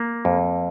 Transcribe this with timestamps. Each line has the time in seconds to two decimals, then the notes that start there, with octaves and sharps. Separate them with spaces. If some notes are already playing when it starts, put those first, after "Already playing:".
Already playing: A#3
0.25 F2